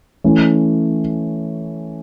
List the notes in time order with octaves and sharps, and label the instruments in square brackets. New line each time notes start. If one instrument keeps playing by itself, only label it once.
[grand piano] E3 A3 C#4